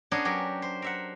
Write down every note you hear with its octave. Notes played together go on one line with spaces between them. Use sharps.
B3 C#4 D4 G#4 A#4
F#3 G4 A#4
C5
A#4 E5 F#5